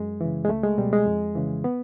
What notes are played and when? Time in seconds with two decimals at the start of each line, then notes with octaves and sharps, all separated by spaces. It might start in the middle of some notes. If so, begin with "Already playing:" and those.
Already playing: F#2 G#3
0.21 C#3 E3
0.45 G#3
0.49 C#2 A3
0.64 G#3
0.78 B2 G3
0.93 G#3
1.06 F2
1.35 C#3 E3
1.64 B3